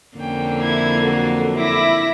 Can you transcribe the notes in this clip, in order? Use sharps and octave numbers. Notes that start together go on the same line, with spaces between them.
F2 D3 A#3 C#4 G5
E4 G#6
F#3 F#4 A4
E4 D6 A#6